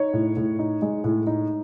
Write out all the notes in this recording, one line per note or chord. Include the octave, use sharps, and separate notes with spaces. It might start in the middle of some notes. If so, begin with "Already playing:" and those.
Already playing: D#4 C#5
A2
A2
D#4
G#3
A2
D#4